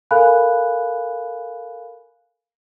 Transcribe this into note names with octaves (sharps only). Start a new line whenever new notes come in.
A4 A#4 F5 G#5 B5 F#6